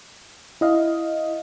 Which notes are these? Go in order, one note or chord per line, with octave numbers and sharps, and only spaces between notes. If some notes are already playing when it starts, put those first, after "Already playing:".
E4 D#5 F5